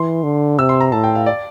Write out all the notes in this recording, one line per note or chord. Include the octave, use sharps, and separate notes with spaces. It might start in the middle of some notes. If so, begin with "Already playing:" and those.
Already playing: E3 C6
D3
C3 E6
C6
A#5
A2 A5
G5
F5
D5